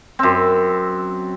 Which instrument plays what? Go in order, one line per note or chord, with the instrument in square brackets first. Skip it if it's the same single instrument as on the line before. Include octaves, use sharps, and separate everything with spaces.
[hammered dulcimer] F#2 C4